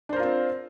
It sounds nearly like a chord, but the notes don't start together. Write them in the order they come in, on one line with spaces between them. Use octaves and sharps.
D4 C5 A#4 F4 C4